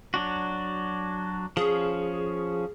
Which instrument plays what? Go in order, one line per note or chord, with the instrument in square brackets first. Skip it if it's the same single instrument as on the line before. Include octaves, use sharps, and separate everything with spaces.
[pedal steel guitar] F#3 D4 F#4
[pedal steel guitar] F3 C#4 [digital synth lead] G#4